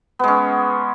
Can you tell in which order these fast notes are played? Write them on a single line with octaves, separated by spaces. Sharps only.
B3 G#3 C#4